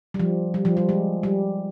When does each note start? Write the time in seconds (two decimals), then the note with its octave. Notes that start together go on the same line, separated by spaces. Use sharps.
0.14 G3
0.20 F3
0.54 G3
0.65 F3
0.77 G3
0.89 G#3
1.23 G3